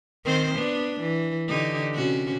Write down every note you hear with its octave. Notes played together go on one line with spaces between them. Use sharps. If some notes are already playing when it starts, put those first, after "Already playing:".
D#3 C4 C5
B3 D4
E3
D3 D#4 G4
C3 C#4 F#4